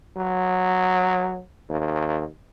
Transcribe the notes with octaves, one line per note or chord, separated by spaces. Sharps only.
F#3
D#2